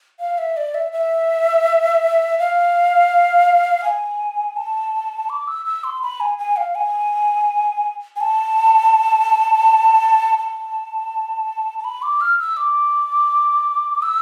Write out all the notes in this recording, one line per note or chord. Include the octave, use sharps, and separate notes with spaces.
F5
E5
D5
E5
E5
F5
G#5
A5
D6
E6
E6
C6
B5
G#5
G#5
F5
G#5
G#5
A5
A5
A5
B5
D6
F6
E6
D6
E6